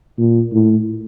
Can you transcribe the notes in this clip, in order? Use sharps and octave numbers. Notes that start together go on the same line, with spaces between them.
A#2
A2